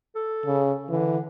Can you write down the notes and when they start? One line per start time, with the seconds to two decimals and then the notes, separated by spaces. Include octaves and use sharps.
0.15 A4
0.46 C#3
0.89 D3 E3